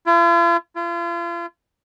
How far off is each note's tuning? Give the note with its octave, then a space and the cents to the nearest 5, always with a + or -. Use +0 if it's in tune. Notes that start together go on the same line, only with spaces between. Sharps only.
F4 -45
F4 -40